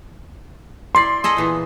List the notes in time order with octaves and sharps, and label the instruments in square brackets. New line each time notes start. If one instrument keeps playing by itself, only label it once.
[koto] E4 D5 [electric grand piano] C6 C7
[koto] G#4 A4 D#5
A#2 E3 B3